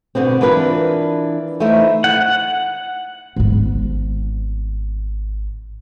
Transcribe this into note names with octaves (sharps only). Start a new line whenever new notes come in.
B2 D3 B3 C4
E3 D4 F4 A#4 B4
E3 A3 D#4 E4 C5 E5
F#5
G#1 B3